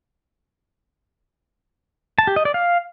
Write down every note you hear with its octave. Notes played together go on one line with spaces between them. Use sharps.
A5
G4
D#5
D5
F5